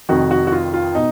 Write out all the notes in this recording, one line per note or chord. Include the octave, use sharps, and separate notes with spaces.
F1 F2 D#3 F#4
F#4
F#4
F4
F4
B2 D#4